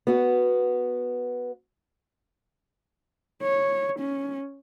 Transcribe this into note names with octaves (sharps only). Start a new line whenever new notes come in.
B3 F#4
C#5
C#4